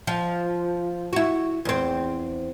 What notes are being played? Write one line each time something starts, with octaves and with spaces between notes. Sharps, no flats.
F3
E4 F#4
E2 C4